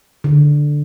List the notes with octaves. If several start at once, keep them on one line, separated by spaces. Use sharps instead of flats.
D3